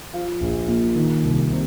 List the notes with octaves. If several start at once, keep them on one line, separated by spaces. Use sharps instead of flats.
F3 F5
A#1
A#2
D#3
C2
C3